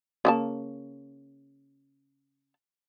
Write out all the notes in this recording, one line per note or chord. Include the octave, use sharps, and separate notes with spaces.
C#3 A#3 A5